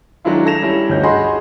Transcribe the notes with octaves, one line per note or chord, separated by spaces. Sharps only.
D#3 F#3 G#3 D4 E4 F4
A4 A#6 E7 F7
G3 C#4 E4
G1 D2 C#4 D#4 C#5 G6
F#4 G#4 D#5 B5 C6